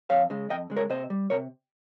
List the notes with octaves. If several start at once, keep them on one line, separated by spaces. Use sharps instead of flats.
F2 C#5 F5
C#3 G#3
F2 D#5 G5
C#3 G#3
A#4 C#5
C3 C5 D#5
G3
C3 A#4 C#5